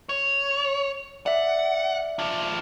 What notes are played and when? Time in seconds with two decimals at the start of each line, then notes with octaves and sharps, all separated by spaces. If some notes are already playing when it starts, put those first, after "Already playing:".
0.09 C#5
1.26 D5 E5 F#5
2.19 D4 F4